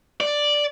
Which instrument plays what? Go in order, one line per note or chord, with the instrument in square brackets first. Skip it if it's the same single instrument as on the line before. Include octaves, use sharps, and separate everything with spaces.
[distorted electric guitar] D5